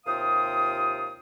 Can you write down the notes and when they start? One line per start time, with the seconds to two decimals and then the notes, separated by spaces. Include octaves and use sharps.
0.07 D#2 C3 F4 F5 G5 D#6